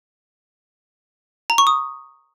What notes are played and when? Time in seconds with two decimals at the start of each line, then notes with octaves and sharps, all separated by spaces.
1.50 A#5
1.58 C#6
1.67 D#6